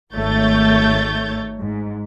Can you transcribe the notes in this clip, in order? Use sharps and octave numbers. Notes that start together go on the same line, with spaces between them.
G#1 D#3 A3 C#5 G6 A6
G#2